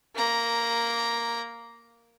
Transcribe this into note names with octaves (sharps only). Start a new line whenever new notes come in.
A#3 A#5